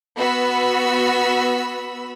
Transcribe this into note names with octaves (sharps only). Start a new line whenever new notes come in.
B3 F#4 B5 E6